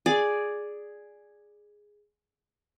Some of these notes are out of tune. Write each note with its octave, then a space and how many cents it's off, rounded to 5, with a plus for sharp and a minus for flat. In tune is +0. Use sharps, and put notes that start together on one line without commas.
G#4 +0 D5 +0